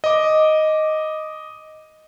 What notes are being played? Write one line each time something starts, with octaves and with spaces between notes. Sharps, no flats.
D#5 D6